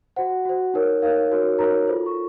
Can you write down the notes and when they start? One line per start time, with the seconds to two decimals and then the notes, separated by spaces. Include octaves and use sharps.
0.16 F#4 C5 F#5
0.45 F#4 C5
0.74 D#4 A#4 C#5
1.02 D#4 A#4 C#5 F5
1.31 D#4 F#4 A#4 C#5
1.59 D#4 F#4 A#4 C#5 A#5
1.88 F4 A4 C5
2.06 C#6